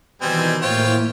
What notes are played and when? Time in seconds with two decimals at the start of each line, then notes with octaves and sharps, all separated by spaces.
0.22 B2 D#3 E3 G3 C4 D#4 G#5
0.62 A2 A#3 E4 F4 C5 C#5 G5